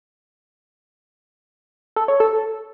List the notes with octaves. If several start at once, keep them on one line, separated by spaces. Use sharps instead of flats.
A4
C#5
A4